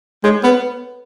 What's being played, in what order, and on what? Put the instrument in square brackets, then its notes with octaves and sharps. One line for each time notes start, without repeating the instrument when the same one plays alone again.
[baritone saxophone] G#3 [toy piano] A4 C#5
[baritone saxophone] B3 [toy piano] B4